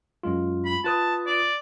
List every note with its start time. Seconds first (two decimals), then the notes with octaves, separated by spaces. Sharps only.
0.23 F#2 G#3 F4
0.65 B5
0.84 F4 B4 A5 D#6
1.27 D5